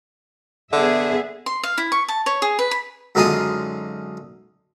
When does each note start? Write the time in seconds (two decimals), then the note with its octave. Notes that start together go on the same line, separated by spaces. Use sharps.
0.73 D3 B3 G#4 E5
1.46 C6
1.63 F5
1.78 E4
1.92 C#6
2.08 A5
2.26 C#5
2.42 G#4
2.59 B4
2.71 B5
3.15 F#2 D3 G#3 D#4 F4 D#6